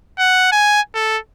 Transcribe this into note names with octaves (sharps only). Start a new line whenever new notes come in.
F#5
G#5
A4